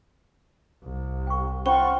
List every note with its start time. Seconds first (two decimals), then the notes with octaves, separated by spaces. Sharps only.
0.83 C2
1.27 G5 C#6
1.66 C#4 F4 C5 F#5 G5 B5 C#6